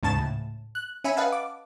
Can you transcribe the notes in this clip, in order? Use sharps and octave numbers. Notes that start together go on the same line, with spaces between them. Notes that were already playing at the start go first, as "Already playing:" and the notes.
D2 G#2 C#3 A5 A6 E7
A2
F#6
C#4 E5 G#5 B5 D#7
B4 D#5 F5 F#5 A5
D6